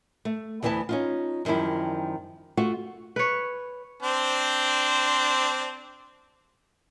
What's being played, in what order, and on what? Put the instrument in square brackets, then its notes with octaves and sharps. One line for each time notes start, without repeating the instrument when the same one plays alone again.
[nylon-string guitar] A3
D2 E3 B3 E4 A5
C#4 D#4 F4
F#2 D#3 F3 G3 E4
A3 F4 F#4
[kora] B4 C#5
[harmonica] C4 D4 C5